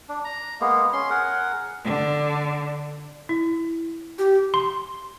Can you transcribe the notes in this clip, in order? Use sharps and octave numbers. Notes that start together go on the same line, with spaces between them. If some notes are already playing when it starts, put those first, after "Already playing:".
D4
A#5
G#3 A#3 B3
C#4 C6
G#4 A#4 F#5
D3
E4
G4
C6